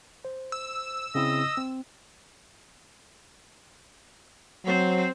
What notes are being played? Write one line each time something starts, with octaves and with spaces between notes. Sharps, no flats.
C5
E6
C#3 C4 E4 D#5
C4
F#3 C4 C5